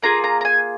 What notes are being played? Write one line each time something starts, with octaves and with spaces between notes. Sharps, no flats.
A#3 F4 G#4 A#5
A#5
A#5
G#5